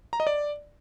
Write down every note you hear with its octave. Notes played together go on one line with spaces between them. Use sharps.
A#5
D#5
D5